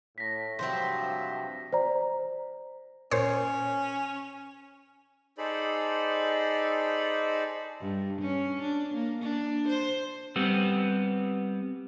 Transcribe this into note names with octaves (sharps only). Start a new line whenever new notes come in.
A2 A#6 B6
G2 C3 F3 F#3 C4 F#4 C5 E5
C5 D5 A#5
A#2 C#4 C5 C#5
D#4 G#4 A4 C5 D5 B5
G2
C#4
D4
A#3
D4
C5
G3 B3 C4